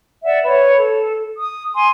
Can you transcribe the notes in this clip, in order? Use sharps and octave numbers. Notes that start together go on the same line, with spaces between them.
D5 E5 F#5
B4 C#5
A4
D#6
G#5 C6